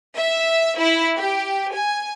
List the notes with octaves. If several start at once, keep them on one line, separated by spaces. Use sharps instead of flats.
E5
E4
G4
G#5